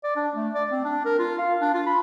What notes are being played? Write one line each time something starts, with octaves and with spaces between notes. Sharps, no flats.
D5
D4
A3
D5
C4
D4
A#4
F4
F5
D4
F4
B5